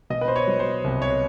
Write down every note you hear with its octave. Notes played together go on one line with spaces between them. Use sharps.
B2 D#5
B4
C5
C#5
F#3
C5
C2
C#5